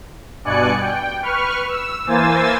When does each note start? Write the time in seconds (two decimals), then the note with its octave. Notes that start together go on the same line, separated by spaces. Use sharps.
0.44 G2 B2 D5 G#5 F#6 C#7
0.81 G5
1.22 B4 C#6 F6
1.68 E6
2.07 E3 A#3 C5 G#5 E6 A6